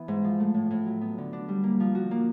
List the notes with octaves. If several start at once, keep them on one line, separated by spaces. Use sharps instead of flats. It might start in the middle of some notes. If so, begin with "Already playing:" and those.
Already playing: E3 B3
G#2
F3
A3
A2
A2
F#3
B3
D3
D4
G3
A#3
F3
F#4
A#3